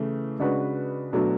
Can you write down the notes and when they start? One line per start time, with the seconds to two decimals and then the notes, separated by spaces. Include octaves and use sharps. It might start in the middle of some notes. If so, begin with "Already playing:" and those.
Already playing: C#3 E3 A3
0.39 C#3 G#3 D4 F#4 B4
1.13 B2 F#3 A3 D4